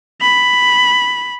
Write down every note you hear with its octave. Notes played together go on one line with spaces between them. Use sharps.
B5